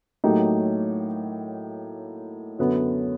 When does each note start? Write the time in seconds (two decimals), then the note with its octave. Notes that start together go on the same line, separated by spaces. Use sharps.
0.24 A2 F#3 A#3 D#4 G4
2.59 F#2 D3 F#3 B3